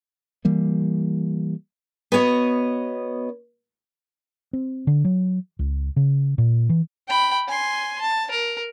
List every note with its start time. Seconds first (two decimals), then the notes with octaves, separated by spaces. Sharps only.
0.45 E3 G3 A#3
2.12 B3 F#4 C#5 D#5
4.53 C4
4.87 D3
5.05 F#3
5.59 C#2
5.96 C#3
6.38 A#2
6.69 E3
7.08 G5 B5
7.48 G#5 C6
8.01 A5
8.31 A#4